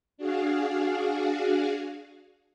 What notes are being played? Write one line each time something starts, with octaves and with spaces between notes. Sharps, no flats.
D4 F#4 G#4 F5